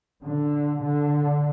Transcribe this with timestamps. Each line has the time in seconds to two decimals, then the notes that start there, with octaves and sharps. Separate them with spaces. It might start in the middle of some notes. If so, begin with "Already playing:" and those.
0.24 D3
0.82 D3